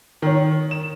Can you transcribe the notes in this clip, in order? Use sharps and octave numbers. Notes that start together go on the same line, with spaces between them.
D#3 C#5
E7